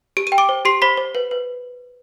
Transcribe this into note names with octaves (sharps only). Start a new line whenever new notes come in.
G4 D7
D#7
G5
D6 D7
C5
G4 C6 C7
C5 B5 B6
C5
B4
B4